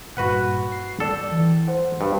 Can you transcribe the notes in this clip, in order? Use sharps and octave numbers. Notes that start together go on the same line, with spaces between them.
G2 A#2 F#4 B4 F#5
C7
A4 D5 G5
E3
C5 F#5
G2